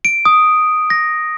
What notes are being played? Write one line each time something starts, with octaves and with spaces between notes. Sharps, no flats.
D7
D#6
A#6